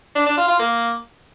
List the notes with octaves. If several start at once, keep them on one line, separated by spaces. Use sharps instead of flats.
D4
D4
F4
F4
A#3